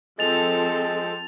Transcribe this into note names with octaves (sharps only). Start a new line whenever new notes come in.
F3 G#3 C4 A4 A6 F7